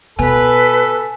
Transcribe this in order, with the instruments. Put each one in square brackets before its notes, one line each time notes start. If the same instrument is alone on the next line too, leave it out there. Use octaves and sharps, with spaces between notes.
[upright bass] B2 [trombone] A4 [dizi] B4 [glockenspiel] G#5